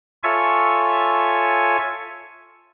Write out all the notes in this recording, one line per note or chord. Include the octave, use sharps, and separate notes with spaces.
F4 A4 C#5 E5 G#5 C#6